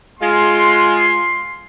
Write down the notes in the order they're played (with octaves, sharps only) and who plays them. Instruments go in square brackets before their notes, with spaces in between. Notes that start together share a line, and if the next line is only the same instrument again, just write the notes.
[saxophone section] G#3 F4 [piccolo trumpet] C6